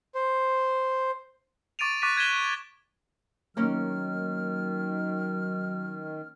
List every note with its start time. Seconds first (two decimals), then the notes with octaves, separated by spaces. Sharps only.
0.15 C5
1.79 C#6 D6 A6 D7 D#7 F7
2.02 C#6 D6 F#6 A6 B6 D#7
2.17 F#6 G#6 B6 D#7 E7 G7
3.57 D#3 F#3 A#3 C#4 F6